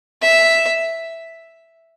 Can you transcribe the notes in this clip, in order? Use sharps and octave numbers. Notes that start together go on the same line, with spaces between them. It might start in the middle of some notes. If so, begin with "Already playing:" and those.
E5